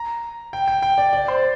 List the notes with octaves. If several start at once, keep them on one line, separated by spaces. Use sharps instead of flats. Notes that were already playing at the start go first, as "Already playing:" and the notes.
Already playing: A#5
G5
G5
G5
D5
D5
C5